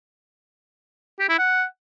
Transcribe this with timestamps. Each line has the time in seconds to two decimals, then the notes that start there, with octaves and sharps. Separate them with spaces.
1.20 G4
1.29 E4
1.38 F#5